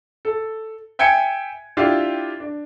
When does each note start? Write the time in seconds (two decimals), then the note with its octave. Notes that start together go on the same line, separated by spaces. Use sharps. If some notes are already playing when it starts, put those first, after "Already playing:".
0.25 A4
0.99 E5 G5 G#5 G#6 C#7
1.77 D4 E4 F4 G4
2.40 D4